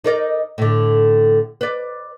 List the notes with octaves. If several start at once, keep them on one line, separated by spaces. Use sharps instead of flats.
D#4 A#4 D5
A2 D3
B4 D5